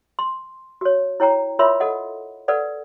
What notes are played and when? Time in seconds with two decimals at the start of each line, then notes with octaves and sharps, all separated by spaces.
0.19 C6
0.81 F#4 C#5
1.20 E4 C#5 G5 A#5
1.59 F4 A#4 C#5 E5 B5 C6
1.80 A4 D#5 F#5
2.48 A4 B4 D5 F#5